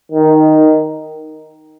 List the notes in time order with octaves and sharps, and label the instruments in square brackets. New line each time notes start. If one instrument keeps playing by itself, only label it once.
[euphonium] D#3